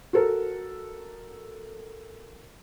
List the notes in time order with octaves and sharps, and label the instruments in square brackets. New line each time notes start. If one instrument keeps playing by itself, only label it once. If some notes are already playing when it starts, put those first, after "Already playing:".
[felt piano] F#4 A4 A#4